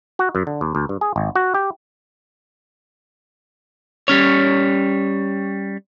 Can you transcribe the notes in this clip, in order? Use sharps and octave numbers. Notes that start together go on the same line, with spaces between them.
F#4
F#2
D3
D#2
D2
G2
G#4
G#1
F#4
G4
G3 C#4 C#5